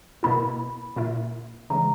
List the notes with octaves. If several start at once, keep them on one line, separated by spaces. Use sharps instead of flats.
B2 A#3 E4 B5
A#2 A#3 E4
C#3 E3 G#3 A#5